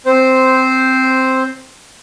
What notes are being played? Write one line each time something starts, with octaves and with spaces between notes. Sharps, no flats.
C4 C5